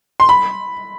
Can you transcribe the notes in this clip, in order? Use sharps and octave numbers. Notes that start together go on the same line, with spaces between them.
C6
B5